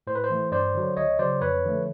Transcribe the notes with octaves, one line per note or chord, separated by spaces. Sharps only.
A2 C5
B4
C5
E3 A3
G2 C5 D5
D3 F#3
C#2 C#5 D#5
C#3 F#3 C5 D5
F2 B4 C#5
D3 F3 A3